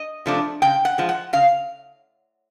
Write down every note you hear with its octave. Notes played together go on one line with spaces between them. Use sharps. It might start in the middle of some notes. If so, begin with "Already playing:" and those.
Already playing: D#5
C3 F3 A3 D4
C#3 G5
F#5
F3 G#3
F#5
C#3 F5